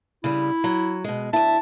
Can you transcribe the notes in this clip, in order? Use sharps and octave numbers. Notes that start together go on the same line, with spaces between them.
C#3 G3 E4
F#3
B2 G#3
D2 E4 A5